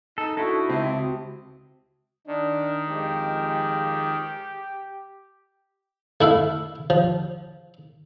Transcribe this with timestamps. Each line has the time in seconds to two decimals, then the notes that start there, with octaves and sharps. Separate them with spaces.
0.18 D#4 A4
0.37 D3 D#4 E4 F#4 A4 C#6 F#6
0.69 C#2 C3 C4 A5
0.97 F#4 D#6
2.27 D#3 D4
2.89 F2 G#3 G4
6.21 A3 E4 E5 F5
6.90 F3